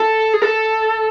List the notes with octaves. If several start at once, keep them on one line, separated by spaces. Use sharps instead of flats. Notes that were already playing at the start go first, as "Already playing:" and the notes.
Already playing: A4
G#4
A4